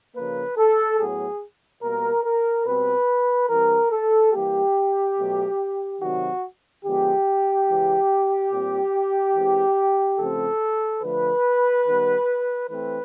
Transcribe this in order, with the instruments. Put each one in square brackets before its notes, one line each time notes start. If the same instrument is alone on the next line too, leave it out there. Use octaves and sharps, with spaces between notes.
[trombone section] C#3 F3 A#3 B4
A4
A2 F#3 B3 G#4
B2 G3 A#3 A#4
A#4
B2 G3 C4 B4
E3 G3 C4 A#4
A4
E3 G3 A#3 G4
B2 F#3 A3
C3 D#3 F#3 F#4
D3 F3 G#3 B3 G4
C#3 E3 G#3
A#2 G3 C4
E3 G#3 C4
C#3 F3 A3 C4 A4
D3 F3 A3 B4
D#3 G3 B3
E3 A3 C4 B4